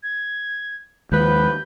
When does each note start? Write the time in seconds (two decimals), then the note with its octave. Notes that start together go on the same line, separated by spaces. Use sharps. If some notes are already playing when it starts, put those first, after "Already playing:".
0.03 G#6
1.12 D#2 D#3 F3 G#3 B4 G6